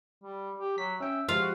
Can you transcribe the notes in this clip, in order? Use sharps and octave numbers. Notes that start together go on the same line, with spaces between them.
G3
G4
F#3 B6
C#4 E5 G5
F3 G#3 F4 G4 F5
F#4